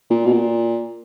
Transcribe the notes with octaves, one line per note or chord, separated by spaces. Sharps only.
A#2
B2
A#2